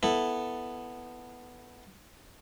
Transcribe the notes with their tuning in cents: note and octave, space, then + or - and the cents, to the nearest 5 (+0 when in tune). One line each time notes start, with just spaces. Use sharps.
B3 +0 E4 +0 A4 +0